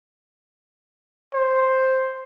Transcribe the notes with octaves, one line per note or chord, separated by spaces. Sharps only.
C5